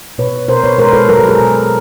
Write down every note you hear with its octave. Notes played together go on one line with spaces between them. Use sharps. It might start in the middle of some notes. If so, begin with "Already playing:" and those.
B2 B4 C#5
B2 A#4 C5
B4 C#5
G#3 A#4 C5
A4 B4
F#3 A#4
A4
G#4 A#4
B2